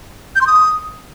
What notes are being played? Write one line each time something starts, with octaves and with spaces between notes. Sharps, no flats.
G6
C6
D#6